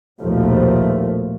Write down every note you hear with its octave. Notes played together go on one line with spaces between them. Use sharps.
A#1 D#2 B2 F3 A3